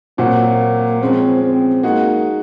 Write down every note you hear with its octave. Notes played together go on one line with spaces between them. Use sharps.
A#2 F#3 A#3 C4 F#4
F3 G#3 C4 C#4
C4
G#3 A#3 D#4 F#4